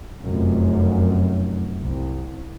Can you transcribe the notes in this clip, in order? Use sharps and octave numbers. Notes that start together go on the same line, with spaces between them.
F1 F#2
C2